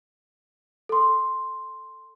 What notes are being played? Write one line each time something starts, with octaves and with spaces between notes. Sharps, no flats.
A4 C6